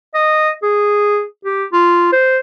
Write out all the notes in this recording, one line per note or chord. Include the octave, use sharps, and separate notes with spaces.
D#5
G#4
G4
F4
C5